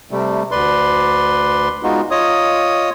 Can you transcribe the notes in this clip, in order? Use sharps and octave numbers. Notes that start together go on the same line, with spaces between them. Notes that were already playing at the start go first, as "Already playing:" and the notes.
C3 G3 A3
D2 B4 D5 C6
G#3 B3 D#4 F4 F#4
F4 C#5 D#5 D#6